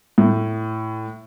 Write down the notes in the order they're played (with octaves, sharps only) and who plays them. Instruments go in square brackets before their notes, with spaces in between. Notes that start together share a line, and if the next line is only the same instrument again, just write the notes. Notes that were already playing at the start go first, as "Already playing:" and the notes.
[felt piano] A2